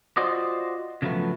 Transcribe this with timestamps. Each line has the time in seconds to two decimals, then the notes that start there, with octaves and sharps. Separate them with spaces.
0.17 F4 F#4 C5 D5 D#5
1.02 C#3 F3 F#3 A3 B3